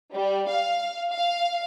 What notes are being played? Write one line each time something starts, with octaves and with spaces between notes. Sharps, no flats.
G3
F5
F5